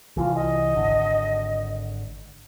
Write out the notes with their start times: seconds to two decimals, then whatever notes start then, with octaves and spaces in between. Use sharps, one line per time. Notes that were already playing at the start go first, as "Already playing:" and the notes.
0.17 C2 E3 F4
0.35 D#5
0.76 G#1 D3